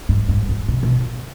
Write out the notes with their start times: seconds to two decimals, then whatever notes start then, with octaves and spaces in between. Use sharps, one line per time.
0.09 G#2
0.29 G#2
0.49 G#2
0.68 B2
0.83 B2